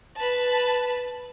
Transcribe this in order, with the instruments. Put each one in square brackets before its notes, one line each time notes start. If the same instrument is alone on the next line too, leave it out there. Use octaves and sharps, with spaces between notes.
[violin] B4 A5